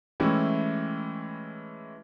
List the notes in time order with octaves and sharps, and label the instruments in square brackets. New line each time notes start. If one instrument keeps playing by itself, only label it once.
[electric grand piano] E3 G#3 A3 C#4 E4 G4